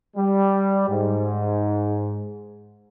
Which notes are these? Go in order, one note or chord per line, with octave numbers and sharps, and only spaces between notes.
G3
G#2